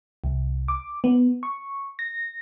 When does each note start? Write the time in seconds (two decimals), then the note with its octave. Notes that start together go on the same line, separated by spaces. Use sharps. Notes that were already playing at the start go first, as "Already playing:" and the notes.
0.24 C2
0.68 D6
1.04 B3
1.43 C#6
1.99 A#6